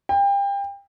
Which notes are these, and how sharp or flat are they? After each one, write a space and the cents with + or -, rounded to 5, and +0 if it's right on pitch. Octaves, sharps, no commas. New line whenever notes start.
G5 +30